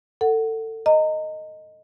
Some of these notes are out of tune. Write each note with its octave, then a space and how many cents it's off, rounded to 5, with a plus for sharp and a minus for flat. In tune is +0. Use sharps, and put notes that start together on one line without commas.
A4 +25 F#5 +10
D#5 +0 A#5 -30